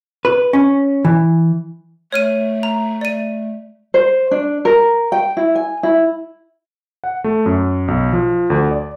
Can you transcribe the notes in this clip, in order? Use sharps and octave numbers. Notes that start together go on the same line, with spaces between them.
B4
C#4
E3
A3 C#5 F6 D#7
A#5
D5 D#7
C5
D4
A#4
G5
E4
G#5
E4
F#5
A3
F#2
B1
F3
D2
D5